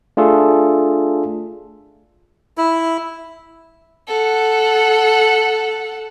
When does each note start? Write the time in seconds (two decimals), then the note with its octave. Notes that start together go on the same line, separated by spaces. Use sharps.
0.17 A3 D4 F4 G#4 A4
2.58 E4
4.08 A4 F#5